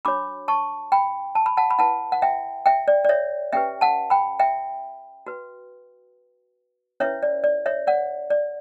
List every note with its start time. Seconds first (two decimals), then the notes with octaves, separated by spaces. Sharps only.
0.05 D4 F#4 C#5 B5 D6
0.48 A5 C#6
0.92 G5 B5
1.35 A5
1.46 B5
1.57 F#5 A5
1.70 B5
1.79 E4 B4 F#5 A5
2.12 F#5
2.22 E5 G5
2.66 E5 G5
2.88 D5
3.05 D5
3.09 C#5 E5
3.52 C#4 G4 B4 E5 G5
3.81 F#5 A5
4.10 G5 B5
4.39 E5 G5
5.27 F#4 B4
7.00 C#4 E4 B4 C#5 E5
7.23 D5
7.44 D5
7.66 C#5 E5
7.87 D5 F#5
8.30 D5